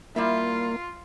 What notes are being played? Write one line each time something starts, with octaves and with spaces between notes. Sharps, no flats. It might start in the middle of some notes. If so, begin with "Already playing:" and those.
G3 A#3 E4 F4 E5